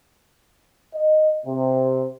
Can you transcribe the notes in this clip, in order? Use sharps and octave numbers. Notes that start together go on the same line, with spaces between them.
D#5
C3